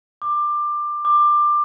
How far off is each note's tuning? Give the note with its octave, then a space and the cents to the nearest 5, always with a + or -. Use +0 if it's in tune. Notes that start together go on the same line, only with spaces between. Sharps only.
D6 +20
D6 +20